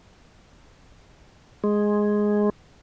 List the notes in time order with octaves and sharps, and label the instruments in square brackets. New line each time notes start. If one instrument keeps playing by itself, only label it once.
[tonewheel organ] G#3